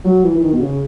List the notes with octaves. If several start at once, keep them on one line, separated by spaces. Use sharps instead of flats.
F#3
E3
E3
D#3
B2
C#3